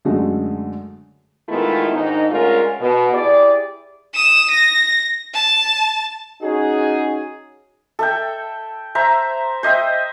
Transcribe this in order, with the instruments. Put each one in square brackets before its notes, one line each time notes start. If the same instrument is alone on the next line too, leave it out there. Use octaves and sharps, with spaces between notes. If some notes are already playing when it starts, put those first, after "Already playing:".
[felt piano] F#2 D3 F#3 G#3 A3
[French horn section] D#3 G#3 A3 B3 E4 F4
G#2 D#3 D4 D#4
D3 G#3 A3 C#4 F4 A#4
B2
E4 G4 G#4 D5
[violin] D#6 E7
A#6
A5
[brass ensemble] C#4 D#4 F#4 G#4
[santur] A4 E5 G5
C5 E5 A#5
C5 D#5 E5 G5